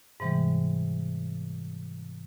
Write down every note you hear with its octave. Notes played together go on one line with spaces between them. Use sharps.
G#2 C3 E3 G3 G#3